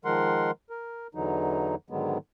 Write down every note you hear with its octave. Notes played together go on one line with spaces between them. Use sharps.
D#3 F3 G#3 A#4 F#5 C6
A#4
E2 D3 E3 F#3 D#4
G#2 D3 D#3 F#3 G#3 B3